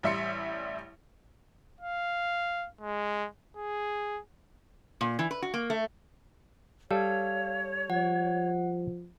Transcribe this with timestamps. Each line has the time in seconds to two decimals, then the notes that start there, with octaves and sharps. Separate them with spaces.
0.03 A1 G3 E5 C6 C#7
1.81 F5
2.81 G#3
3.56 G#4
5.01 A#2
5.19 E3
5.31 B4
5.42 F#4
5.54 A#3
5.70 A3
6.91 G3 A4 C#5 F5
7.90 F3 F#5